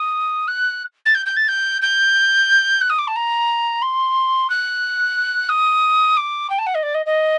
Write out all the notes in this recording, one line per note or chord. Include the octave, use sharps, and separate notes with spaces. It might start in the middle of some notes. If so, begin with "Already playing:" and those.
Already playing: D#6
F#6
A6
G6
G6
A6
G6
G6
F#6
D#6
D6
A5
A#5
C6
F#6
D#6
D6
G5
A5
F#5
D#5
D5
D#5
D#5